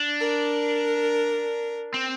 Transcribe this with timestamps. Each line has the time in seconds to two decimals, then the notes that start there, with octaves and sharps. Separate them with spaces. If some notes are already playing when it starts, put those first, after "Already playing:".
Already playing: D4
0.20 A#4
1.94 C4